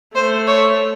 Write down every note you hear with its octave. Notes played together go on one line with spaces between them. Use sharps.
A3 C5
C#5